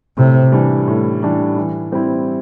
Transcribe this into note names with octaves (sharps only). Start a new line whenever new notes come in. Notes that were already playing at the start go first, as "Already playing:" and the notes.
A2 C3
E3 G3 D4
A2
E3 G3 D4
E3
G3 C4 E4